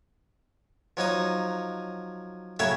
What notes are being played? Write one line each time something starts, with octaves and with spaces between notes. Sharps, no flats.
F3 F#3 D#4 D#6
A2 C#3 F#3 C#5 E5 A5